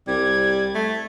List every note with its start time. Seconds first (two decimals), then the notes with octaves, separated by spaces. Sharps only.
0.07 C2 G3 G#6
0.75 A3